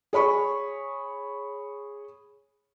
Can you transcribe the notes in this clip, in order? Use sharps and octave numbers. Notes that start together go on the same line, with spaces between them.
G#4 C#5 B5 C#6